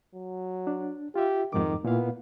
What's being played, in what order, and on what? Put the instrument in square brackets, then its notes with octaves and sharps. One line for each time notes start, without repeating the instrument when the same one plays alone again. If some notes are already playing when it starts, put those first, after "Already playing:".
[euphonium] F#3
[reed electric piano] D4
[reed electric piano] F4 E5 [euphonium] G4
[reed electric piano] F2 G#2 D6 [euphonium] D#3
[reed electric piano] A#2 E4 F5 [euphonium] B3